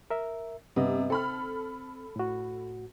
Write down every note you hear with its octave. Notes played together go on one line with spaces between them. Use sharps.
A#4 E5
G2 C3 B3 D#5
C4 A4 B5 F6
A2 F#4